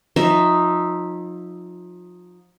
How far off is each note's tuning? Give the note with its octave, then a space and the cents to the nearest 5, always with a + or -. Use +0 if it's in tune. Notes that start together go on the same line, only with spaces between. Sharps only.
F3 +35 D#4 +0 E5 +0